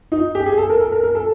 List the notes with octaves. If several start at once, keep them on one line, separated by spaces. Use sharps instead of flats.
D#4
G4
G#4
A4
A#4
A4
A#4
A#4
A4